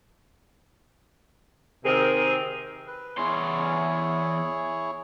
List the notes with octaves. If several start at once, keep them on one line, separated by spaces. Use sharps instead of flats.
C3 D#3 C4 G#4 A#4
B4
E2 E4 G#4 C#5 C6